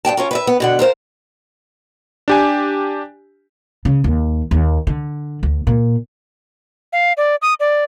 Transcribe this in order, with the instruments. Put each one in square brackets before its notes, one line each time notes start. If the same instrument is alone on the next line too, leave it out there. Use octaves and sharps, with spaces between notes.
[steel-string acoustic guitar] G2 D#3 G5 A5
C#4 F4 A#4
B4 D5 E5
B3
B2 D3 F#5
F4 A#4 C5 F5
[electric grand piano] D4 G4 G#5
[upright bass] C#3
D#2
D#2
D3
D2
A#2
[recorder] F5
D5
D#6
D5